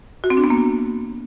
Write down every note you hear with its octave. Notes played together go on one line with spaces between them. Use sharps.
F#4
C4
D4
B3
A#3